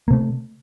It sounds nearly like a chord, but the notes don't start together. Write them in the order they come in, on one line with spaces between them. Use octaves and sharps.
A#3 C3 A3